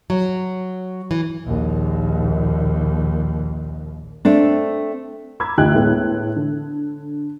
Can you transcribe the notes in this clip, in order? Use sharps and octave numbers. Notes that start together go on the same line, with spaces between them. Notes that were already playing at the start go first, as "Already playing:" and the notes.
F#3
E3
A#1 D#2
A3 C4 D4
A#5 B5 D6 E6 G#6
D2 F4 G4 D#5 G5 F#6
A2 G#3 B3
D3